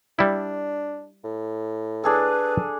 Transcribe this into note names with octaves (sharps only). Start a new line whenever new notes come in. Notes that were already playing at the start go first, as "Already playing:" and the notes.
G3 D4 E4
A2
D4 G#4 A4 B4